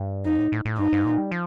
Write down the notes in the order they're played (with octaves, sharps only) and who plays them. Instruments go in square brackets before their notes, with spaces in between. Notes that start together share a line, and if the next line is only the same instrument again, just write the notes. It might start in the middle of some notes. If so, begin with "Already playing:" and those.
Already playing: [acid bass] G2
[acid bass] F2 [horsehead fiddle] D#4
[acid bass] A2
A2
A2
[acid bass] G2 [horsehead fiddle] D#4
[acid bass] G2
A#2
G3
F3